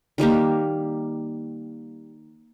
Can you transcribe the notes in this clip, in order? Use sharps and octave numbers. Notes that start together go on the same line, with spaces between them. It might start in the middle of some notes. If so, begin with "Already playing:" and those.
D#3 G3 A#3 G4